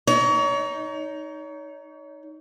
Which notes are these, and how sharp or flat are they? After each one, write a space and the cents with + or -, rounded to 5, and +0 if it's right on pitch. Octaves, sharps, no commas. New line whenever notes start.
D#4 +0 C#5 +35